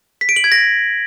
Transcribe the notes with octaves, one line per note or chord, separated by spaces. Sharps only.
B6
D7
F#7
G#6
A#6